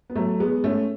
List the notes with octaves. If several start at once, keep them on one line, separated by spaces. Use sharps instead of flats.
B3
F#3 A3
G#3 B3
A3 C#4